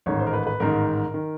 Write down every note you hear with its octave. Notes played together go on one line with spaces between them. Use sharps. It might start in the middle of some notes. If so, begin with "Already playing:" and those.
A1 G#2 D#3 C#5
C5
A#4
B4
B4
A1 G#2 D#3 A#4
D#3